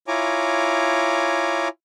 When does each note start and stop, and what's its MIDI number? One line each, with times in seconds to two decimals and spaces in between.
0.08 1.68 64
0.08 1.68 65
0.08 1.68 73
0.08 1.68 80
0.08 1.68 82
0.08 1.68 86